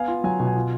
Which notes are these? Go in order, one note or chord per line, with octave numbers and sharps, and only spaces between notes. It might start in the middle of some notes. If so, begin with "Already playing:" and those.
Already playing: B3 F5 G#5
F4
F#3 G#5
B2
G#5
F4